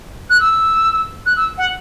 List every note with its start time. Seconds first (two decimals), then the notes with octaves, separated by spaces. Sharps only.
0.30 F#6
0.40 E6
1.26 F#6
1.37 E6
1.58 F#5